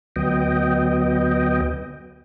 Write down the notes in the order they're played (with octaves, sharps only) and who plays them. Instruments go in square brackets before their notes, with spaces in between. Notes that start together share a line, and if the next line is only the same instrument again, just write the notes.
[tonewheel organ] D2 F#3 B3 D#5 G5